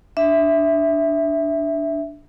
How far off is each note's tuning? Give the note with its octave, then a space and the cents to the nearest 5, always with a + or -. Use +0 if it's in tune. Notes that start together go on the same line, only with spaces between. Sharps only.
D4 +0 E5 +0